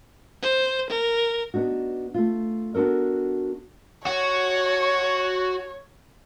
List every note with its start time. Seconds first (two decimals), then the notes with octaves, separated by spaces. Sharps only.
0.42 C5
0.90 A#4
1.54 B3 D4 D#4 F#4
2.14 A3 F4
2.74 B3 D4 F#4 A4 A#4
4.06 F#4 C#5